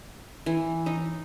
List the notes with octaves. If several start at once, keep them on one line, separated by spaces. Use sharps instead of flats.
E3
D#4